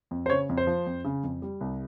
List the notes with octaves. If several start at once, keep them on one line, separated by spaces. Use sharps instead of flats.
F2
C5
C#3 C#5
F2
C5
F3
F2
C#3
F2
G3
C2